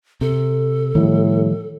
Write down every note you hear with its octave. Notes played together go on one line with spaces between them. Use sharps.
C3 A4
A2 D#3 F3 G3